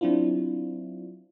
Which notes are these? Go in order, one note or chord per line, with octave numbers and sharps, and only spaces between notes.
F#3 C4 D4 E4 F4